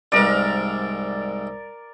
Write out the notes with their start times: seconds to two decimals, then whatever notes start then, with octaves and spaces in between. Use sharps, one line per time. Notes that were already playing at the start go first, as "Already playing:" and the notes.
0.12 C2 G#2 A#4 D5